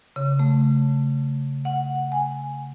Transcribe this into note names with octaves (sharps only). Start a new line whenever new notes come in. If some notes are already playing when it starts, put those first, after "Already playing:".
C#3
A3
F#5
G#5